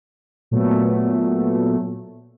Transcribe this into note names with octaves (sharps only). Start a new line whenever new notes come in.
A#2 F#3 A3 B3